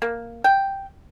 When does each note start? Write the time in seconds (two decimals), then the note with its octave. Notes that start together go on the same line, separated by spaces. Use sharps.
0.02 A#3
0.44 G5